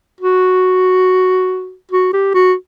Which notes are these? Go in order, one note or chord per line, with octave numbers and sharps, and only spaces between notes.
F#4
F#4
G4
F#4